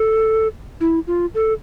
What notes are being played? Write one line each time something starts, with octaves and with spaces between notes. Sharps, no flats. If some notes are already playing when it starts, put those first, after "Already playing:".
Already playing: A4
E4
F4
A4